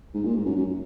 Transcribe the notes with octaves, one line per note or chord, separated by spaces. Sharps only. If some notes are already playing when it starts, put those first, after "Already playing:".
G#2
A#2
G#2
F#2
F#2